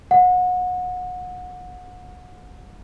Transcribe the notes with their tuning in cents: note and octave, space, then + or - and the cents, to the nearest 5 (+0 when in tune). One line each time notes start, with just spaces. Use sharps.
F#5 -30